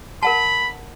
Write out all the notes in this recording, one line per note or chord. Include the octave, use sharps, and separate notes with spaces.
A#4 F#5 A5 B5